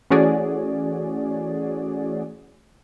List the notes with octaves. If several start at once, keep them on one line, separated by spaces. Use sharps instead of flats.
E3 A3 C#4 F#4 G#4 D5